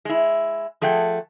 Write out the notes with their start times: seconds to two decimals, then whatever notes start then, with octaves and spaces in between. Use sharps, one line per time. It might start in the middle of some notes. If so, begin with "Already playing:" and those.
0.05 G#3 E4
0.81 F3 A3 G#4 F#5 G5